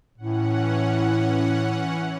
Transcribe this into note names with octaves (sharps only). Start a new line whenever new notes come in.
A2 E3 C#4 F#5